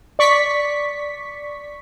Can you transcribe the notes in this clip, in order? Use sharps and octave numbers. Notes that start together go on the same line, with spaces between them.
D5 C#6 B6